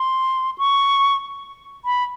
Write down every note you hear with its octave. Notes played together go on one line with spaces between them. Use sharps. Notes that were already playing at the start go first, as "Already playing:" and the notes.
Already playing: C6
C#6
B5